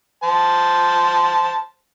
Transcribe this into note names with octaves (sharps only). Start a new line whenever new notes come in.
C5 A5